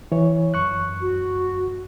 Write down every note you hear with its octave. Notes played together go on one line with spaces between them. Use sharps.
E3 C#5
F#2 C#6 F#6
F#4